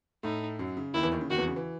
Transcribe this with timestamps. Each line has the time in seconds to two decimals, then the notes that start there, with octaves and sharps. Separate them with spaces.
0.23 A2 A3 D#4
0.59 F#2 F#3
0.77 C#3
0.94 D#2 D#3 E4
1.03 E2 E3
1.12 D#2 D#3
1.21 C#3
1.30 D#2 D#3 F#4
1.38 E2 E3
1.47 C#3
1.56 E3